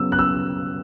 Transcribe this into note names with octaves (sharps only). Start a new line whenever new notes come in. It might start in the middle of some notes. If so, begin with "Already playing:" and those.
Already playing: C#3 F#3 B3 E6
F#6
E6